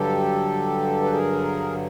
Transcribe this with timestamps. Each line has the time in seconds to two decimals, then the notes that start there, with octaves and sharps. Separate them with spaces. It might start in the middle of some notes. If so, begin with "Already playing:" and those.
Already playing: G2 D3 F#3 G4 A4
1.03 B4
1.12 G#4 A#4